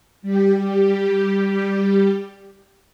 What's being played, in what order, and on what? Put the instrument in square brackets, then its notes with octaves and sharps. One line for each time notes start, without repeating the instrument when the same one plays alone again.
[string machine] G3 G4